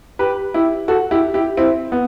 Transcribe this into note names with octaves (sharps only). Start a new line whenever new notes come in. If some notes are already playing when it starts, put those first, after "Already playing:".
G4 B4
E4 G4
F#4 A4
E4 G4
E4 G4
C4 E4
B3